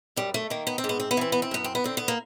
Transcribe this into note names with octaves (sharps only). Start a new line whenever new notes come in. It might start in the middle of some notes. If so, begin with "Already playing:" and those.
F#2 G3
A3
D#3 A#3
B3
C4
G#2
B3
C4
B3
E3 C4
B3
C4
F#2 B3
C4
B3
D3 C4
B3
A#3